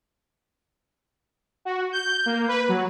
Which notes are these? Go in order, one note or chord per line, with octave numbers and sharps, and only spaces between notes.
F#4
G6
A#3
B4
F#3